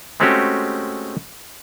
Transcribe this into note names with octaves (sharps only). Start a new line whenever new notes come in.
G#3 A3 C4 C#4 F#4 G4